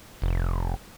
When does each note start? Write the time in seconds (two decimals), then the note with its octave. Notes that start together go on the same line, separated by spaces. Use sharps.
0.22 F1